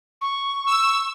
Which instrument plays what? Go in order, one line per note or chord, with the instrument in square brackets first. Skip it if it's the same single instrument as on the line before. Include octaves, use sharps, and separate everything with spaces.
[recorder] C#6
[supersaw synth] E6